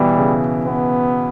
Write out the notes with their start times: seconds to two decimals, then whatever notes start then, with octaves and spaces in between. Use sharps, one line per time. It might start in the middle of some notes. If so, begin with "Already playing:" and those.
Already playing: B2 E3 G3
0.17 C#3
0.66 B3